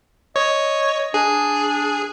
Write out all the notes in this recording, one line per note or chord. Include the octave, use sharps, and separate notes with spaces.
C#5 D#5
D4 G#4